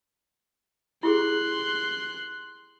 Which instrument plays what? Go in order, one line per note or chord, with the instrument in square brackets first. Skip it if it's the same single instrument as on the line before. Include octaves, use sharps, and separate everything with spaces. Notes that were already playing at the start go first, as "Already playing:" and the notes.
[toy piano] E4 G4 G#4 [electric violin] C6 F#6